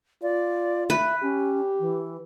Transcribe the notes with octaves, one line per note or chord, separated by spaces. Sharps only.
F4 D5
B4 E5
C#4 G4
E3